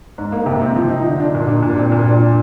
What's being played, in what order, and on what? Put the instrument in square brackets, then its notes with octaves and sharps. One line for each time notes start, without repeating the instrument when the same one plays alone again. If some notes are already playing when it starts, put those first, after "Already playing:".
[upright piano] G#2
A#3
C3
C4
F3
D#4
D3
D4
A#2
D4
A#2
C4
A#2
D4